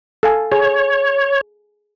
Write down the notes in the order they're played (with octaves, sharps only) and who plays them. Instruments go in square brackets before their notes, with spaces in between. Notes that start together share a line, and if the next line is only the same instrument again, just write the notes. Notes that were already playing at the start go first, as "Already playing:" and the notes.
[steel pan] A4 F5 G#5
[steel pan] G#4 [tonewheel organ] C#5